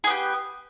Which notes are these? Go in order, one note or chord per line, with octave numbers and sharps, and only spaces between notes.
B3 G4 G#4